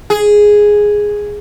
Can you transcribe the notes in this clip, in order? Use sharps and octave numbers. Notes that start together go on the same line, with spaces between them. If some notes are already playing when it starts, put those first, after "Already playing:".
G#4